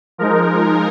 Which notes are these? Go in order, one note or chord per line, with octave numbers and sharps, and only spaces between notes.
F3 G#3 D#4 A#4